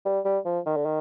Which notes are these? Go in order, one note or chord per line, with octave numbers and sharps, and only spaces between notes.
G3
G3
F3
D#3
D3
D#3